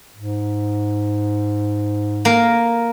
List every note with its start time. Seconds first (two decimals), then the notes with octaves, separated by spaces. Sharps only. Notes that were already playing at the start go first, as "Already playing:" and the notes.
0.16 G#2
2.25 A#3 A#4